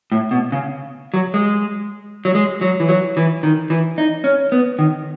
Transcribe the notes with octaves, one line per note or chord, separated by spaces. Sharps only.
A2
B2
C#3
F#3
G#3
F#3
G#3
F#3
E3
F#3
E3
D#3
E3
D#4
C#4
B3
D#3